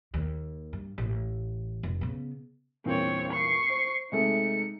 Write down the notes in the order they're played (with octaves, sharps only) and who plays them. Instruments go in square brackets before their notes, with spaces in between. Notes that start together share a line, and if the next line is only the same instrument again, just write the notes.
[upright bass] D#2
G2
A1
F1
C#3 B3
[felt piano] E2 G2 A#2 [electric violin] C4 C#5
[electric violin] C#6 C7
[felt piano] C5
[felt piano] C3 G#3 A3 [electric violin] D#4 C#7